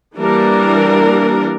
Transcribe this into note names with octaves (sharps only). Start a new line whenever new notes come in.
E3 G3 A#3 D4 A#4